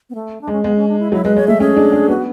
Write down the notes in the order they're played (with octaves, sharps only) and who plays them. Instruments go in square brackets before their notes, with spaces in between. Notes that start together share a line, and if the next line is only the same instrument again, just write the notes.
[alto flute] B3
A3
D4
[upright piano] G#3
[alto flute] C#4
[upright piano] G#3 [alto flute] B3
[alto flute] C#4
D4
E4
[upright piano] F#3 [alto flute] E4
[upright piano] G#3 [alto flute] B4
[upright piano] G#3 [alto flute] C#5
[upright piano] A3 [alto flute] E5
[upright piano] C#4 [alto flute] G#4
[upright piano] D4
D4
[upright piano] B3 [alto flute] F#4